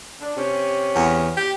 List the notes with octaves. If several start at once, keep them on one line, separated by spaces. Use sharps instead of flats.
D4
C3 C#4 G4
E2
G4